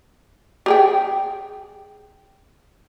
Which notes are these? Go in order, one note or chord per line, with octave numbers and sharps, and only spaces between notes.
G4 G#4 G5